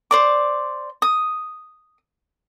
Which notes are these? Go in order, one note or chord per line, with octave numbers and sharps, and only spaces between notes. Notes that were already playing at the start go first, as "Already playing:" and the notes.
C5 D5 D6
D#6